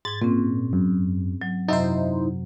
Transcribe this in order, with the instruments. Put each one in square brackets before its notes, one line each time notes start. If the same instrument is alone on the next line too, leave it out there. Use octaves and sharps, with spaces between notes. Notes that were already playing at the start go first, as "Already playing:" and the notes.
[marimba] G#2 [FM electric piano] G#6 A6
[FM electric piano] A#2 [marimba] C4 C#4
[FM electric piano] F#2
[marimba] F#3
[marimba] F#2 C3 F#3 [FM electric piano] D#4 E4 C5